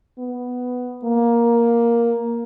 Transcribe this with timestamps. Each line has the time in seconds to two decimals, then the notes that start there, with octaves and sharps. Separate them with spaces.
0.19 B3
1.04 A#3